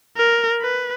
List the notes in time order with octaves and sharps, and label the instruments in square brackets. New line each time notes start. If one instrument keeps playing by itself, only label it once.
[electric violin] A#4
B4